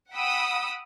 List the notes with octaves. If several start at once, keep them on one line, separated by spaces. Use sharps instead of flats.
F#5 G5 B5 D#6 E6